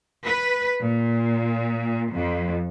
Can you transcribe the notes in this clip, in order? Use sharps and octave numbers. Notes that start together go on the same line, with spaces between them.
B4
A#2
F2